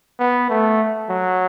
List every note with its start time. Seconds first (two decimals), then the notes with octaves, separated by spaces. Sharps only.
0.19 B3
0.50 A3
1.10 F#3